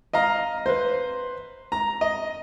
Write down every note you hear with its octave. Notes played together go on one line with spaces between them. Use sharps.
D#5 F5 A#5
B4 C5
A#5
D#5